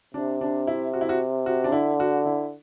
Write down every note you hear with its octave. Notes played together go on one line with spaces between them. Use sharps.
C3 D4
D4
E4
F#4
E4
F#4
F#4
D4
D3 E4
F#4
E4